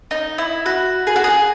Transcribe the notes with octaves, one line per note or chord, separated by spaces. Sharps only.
D#4
E4
F#4
G#4
F#4
G#4